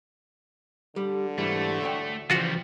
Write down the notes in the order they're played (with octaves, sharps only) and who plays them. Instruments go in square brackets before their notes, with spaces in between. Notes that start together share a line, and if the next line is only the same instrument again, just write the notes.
[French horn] D3 [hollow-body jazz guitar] G3
[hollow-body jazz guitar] G#2 E3 G3 [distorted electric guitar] A3
[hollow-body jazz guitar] D2 C#5 G5
[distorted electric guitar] C#3 G3 [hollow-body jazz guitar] E3 F3 [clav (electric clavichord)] F4 F#4 F#5